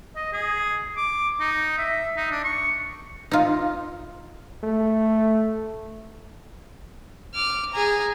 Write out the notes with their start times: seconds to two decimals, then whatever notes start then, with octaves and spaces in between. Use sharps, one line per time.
0.16 D#5
0.33 G#4
0.97 D6
1.40 D#4
1.78 E5
2.17 D#4
2.31 D4
2.44 C#6
3.31 D#4 F4
4.63 A3
7.34 D6 F6
7.73 G#4 A#5